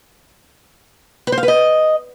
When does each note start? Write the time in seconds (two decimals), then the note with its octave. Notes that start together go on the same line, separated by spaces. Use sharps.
1.27 B4
1.32 C5
1.38 F5
1.43 B4
1.48 D#5